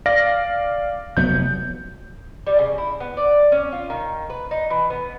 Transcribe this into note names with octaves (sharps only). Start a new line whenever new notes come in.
D5 F5 A#6
F1 F#3 B3 G6
G3
C#3
E4
B3
D5
C#4
F4
D#3
B4
D#4
E3
B3